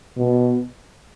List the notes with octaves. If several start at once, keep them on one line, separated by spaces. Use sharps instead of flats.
B2